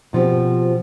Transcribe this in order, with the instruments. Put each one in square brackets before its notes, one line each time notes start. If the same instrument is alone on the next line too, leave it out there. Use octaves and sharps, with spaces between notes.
[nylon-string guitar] B2 F3 C4 G4